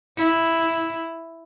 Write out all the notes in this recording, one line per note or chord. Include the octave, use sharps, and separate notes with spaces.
E4